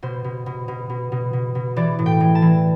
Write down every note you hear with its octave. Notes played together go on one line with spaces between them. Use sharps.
B2 C5
B2
B2
B2
B2
B2
B2
B2
E3 D5
A2
G5
E3
A5
E3